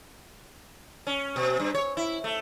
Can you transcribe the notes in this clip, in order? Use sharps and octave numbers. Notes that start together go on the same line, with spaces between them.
C#4
B2
G2
C#5
E4
A3